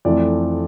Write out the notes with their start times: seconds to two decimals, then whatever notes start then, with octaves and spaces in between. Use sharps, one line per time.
0.05 F2 E3 A3 D5